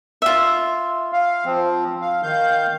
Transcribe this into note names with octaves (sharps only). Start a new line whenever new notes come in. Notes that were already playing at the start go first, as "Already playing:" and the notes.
F4 E5
F5
F3 C4
F5
D#3 F5 G6